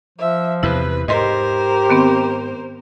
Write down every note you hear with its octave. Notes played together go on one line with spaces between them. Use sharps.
F3 E5
E2 C3 E4 B4
G#2 G4 A#4 C5 D#5 C6
D#3 B3 C4